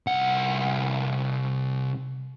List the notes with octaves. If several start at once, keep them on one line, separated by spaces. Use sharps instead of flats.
C2 F#5